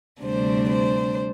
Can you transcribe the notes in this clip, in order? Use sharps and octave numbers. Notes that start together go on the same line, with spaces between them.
D2 C3 G3 D4 C5
C5